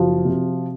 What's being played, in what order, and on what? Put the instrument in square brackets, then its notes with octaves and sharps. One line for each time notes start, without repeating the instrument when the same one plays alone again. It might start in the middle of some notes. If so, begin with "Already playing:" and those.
Already playing: [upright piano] F#1 F3 [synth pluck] F#4
[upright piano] C3